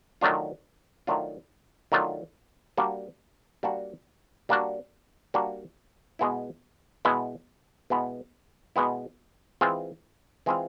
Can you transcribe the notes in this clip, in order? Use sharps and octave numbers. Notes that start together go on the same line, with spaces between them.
D#3 F#3 A3 D4 F4
D#3 F#3 A3 D4 F4
D#3 F#3 A3 D4 F4
G3 A#3 D4 F#4
G3 A#3 D4 F#4
G3 A#3 D4 F#4
G3 A#3 D4 F#4
B2 G#3 B3 E4
B2 G#3 B3 E4
B2 G#3 B3 E4
B2 G#3 B3 E4
E3 G#3 C4 F4 G#4
E3 G#3 C4 F4 G#4